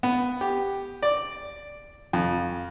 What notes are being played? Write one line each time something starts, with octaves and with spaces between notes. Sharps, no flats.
B3
G4
D5
F2